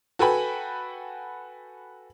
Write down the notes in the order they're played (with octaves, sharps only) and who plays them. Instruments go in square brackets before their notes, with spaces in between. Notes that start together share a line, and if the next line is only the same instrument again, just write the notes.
[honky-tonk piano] F#4 A4 B4 G5 G#5 B5